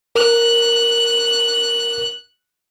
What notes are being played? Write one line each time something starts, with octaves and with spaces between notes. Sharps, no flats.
A#4 F#6